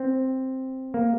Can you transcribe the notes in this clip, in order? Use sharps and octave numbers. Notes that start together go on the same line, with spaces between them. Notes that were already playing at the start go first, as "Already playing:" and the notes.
Already playing: C4
A#3